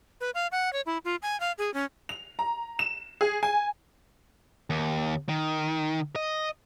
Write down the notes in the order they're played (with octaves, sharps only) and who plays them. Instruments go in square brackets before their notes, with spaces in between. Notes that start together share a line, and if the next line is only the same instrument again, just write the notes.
[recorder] B4
F5
F#5
C#5
E4
F4
G#5
F5
G#4
C#4
[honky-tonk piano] F7
A#5
E7
G#4
G#5
[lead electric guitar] D#2
D#3
D#5